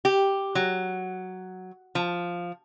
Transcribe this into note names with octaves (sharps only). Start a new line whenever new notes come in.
G4
F#3
F3